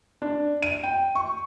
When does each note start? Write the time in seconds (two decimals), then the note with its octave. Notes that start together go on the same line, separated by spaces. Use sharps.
0.22 D4
0.62 D#7
0.83 G5
1.15 C#6